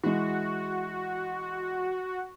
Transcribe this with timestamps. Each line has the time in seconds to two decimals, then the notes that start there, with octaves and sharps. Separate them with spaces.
0.04 E3 G#3 F#4